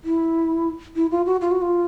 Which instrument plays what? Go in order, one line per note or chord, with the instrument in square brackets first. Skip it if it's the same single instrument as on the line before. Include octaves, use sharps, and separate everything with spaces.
[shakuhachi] E4
E4
F4
F#4
F4
F#4
F4